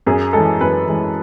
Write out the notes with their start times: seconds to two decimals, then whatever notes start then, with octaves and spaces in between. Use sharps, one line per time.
0.06 F#2 G#4
0.33 E3 G#3 A4
0.61 F#2 B4
0.88 E3 G#3